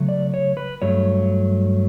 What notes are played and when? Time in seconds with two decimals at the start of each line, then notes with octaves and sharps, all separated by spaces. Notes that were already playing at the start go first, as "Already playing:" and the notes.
Already playing: C#3 F#3 A3
0.09 D5
0.34 C#5
0.57 B4
0.82 G2 F#3 A3 C#5